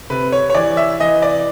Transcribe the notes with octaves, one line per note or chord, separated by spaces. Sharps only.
C3 B4
C#5
C#5
E3 D5
E5
E3 D#5
D5